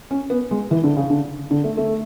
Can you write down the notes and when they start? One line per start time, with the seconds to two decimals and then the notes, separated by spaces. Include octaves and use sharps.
0.11 C#4
0.30 B3
0.51 G#3
0.71 E3
0.84 D3
0.96 C#3
1.10 D3
1.51 D3
1.64 A3
1.77 A3